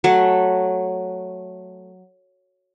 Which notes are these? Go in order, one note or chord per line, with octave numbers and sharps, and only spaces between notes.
F#3 A3 F#5